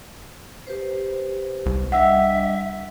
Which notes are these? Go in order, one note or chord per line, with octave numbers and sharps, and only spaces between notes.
G4 B4 C5
C2
G3 D4 D#5 E5 F#5 E6